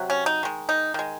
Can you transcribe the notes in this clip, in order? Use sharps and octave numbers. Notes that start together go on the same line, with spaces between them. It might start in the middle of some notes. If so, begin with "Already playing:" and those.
Already playing: C3 F#3
C#4
D#4
D#3 G#3
D#4
D#3 G#3